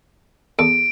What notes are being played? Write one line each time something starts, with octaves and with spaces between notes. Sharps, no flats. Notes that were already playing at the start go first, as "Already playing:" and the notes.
E2 A4 C#6 D7